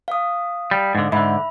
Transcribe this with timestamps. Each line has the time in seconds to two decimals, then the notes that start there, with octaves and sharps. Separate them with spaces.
0.08 F5 D#6
0.71 G3
0.95 G#2 D3
1.12 G#2 D3 E5 B5